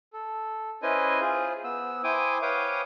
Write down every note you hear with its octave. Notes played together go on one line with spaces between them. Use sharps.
A4
C#4 E4 B4 C5 D#5 G#5
F4 G#4 C5
B3 E6
E4 C5 G5 G#5 D6 D#6
B4 C#5 F5 G5 D6 D#6